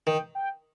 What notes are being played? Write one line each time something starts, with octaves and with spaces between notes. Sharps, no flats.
D#3 G5
G5